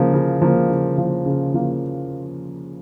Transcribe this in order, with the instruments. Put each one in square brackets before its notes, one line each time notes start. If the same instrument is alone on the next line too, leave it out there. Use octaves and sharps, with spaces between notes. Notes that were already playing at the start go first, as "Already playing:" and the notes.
Already playing: [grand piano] C#3 F3 A#3
C#3
F3 A#3
C#3
F3 A#3
C#3
F3 A#3